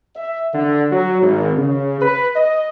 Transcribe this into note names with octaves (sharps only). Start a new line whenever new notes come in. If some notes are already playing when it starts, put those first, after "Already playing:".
E5
D3
F#3
G#1
C#3
B4
D#5